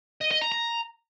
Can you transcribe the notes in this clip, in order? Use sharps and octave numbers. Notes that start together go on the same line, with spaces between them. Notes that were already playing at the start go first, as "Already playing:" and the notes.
D#5
D#5
A#5
A#5